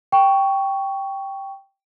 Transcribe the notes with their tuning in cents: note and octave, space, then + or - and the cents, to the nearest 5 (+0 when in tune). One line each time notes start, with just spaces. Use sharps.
G5 +0 C#6 +10